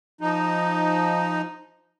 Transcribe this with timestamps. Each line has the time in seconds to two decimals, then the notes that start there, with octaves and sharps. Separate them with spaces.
0.21 F3 D#4